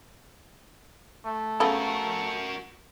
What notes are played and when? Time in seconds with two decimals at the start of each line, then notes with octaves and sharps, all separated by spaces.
1.25 A3
1.60 C#3 B3 F#4 A4 A#4